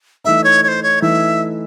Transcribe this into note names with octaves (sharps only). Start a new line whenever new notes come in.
E3 A3 D#4 E5
C#5
C#5
C5
C#5
E3 A3 D#4 E5